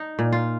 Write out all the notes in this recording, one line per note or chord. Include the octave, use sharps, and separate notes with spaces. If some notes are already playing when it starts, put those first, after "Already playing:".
Already playing: D#4
A#2
F4